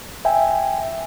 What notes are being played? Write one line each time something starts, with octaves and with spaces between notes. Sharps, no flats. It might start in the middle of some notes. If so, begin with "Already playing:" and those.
E5 G5 G#5